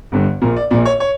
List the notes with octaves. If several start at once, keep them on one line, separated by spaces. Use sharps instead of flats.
G1 G2 D3
A#1 A#2 A#4
D5
A#1 A#2 D5
C#5
C#5